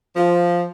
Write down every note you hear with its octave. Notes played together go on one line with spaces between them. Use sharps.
F3